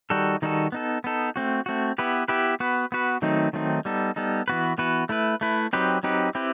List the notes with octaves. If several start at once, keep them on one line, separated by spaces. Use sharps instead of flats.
D#3 G3 D#4 F#4 A4
D#3 G3 D#4 F#4 A4
B3 D#4 A4
B3 D#4 A4
A3 C4 F#4
A3 C4 F#4
B3 E4 G4 B4
B3 E4 G4 B4
B3 F#4 B4
B3 F#4 B4
D#3 F#3 A3 C4 D#4
D#3 F#3 A3 C4 D#4
G3 B3 D#4 A4
G3 B3 D#4 A4
E3 B3 F#4 B4
E3 B3 F#4 B4
A3 E4 B4
A3 E4 B4
F#3 C4 D#4 G4 B4
F#3 C4 D#4 G4 B4
C4 E4 G4 B4